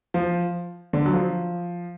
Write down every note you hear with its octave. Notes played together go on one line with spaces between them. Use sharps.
F3
D3
F#3
F3